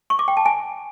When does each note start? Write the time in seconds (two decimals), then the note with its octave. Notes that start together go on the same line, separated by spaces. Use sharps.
0.10 C#6
0.19 D6
0.28 G5
0.37 A5
0.46 G#5